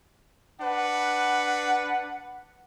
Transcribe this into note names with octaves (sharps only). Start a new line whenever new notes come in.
D4 B4 F#5